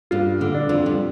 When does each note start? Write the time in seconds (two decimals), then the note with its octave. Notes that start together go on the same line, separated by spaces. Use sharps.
0.11 G2 G3 F4
0.41 D3
0.55 D4
0.69 F2 F3
0.86 G3